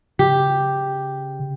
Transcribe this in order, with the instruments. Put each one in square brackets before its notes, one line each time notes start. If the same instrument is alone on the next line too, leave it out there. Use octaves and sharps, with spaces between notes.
[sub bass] C#3 [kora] G4